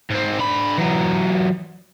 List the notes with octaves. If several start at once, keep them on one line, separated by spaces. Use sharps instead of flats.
G#2 C4
D3 B5
E3 F#3